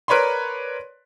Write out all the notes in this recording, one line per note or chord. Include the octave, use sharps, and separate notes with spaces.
A#4 B4 C#5 D5 B5 C6